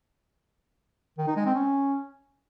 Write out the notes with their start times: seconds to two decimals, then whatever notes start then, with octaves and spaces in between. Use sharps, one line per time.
1.18 D#3
1.27 D#4
1.36 G#3
1.46 C4
1.55 C#4